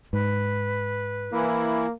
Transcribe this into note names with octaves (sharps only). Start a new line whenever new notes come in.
G#2 B4
E3 A#3 E4